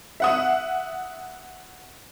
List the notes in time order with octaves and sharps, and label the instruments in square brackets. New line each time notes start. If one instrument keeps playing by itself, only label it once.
[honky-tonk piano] E5 F#5 D#6